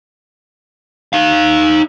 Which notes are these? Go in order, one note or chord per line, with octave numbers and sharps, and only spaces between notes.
D#4 F5